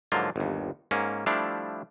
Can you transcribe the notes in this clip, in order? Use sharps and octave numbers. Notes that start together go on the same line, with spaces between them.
G#2 D3 F3 F#3 A#3 F4
G1 D#2
G#2 A#3 C#4
F3 G3 A3 D4 E4 F5